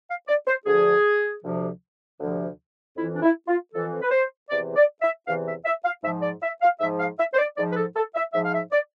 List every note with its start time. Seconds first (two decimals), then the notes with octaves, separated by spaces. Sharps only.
0.08 F5
0.28 D5
0.47 C5
0.66 D2 D3 F3 G#4
1.43 D2 C3 F3
2.20 D2 C3 F3
2.96 F2 E3 E4
3.15 D4
3.22 E4
3.48 F4
3.73 F2 E3 A4
4.02 B4
4.11 C5
4.50 E2 C3 E3 D5
4.76 D5
5.01 E5
5.27 E2 C3 E3 F5
5.46 E5
5.65 E5
5.84 F5
6.04 G#2 E5
6.08 F3
6.22 D5
6.42 E5
6.62 F5
6.80 G#2 F3 E5
7.00 F5
7.19 E5
7.34 C5
7.38 D5
7.57 G#2 D5
7.61 F3
7.72 B4
7.76 A4
7.96 A4
8.15 E5
8.34 G#2 F3 E5
8.45 F5
8.53 E5
8.72 D5